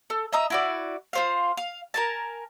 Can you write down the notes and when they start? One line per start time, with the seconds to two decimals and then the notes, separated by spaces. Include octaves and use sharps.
0.10 A4
0.33 D#5 E5 A#5 D#6
0.50 E4 F#4 D5
1.13 F4 C5 F5
1.57 F5
1.94 A#4 G#5 A5